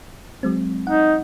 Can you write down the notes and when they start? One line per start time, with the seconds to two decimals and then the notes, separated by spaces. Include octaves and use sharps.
0.43 F#3 G#3 C4
0.87 D#4 F#5